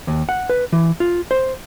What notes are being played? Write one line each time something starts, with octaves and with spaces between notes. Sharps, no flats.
D#2
F#5
B4
E3
F4
C5